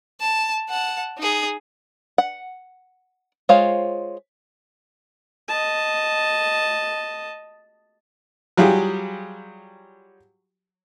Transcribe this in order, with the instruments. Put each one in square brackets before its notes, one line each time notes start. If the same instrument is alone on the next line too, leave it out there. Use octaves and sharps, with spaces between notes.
[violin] A5
F#5 A5
D#4 G#4
[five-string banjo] F#5
G#3 F4 C5 C#5 F5
[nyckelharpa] D#5 A5
[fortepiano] F#3 G3 F4 G4 G#4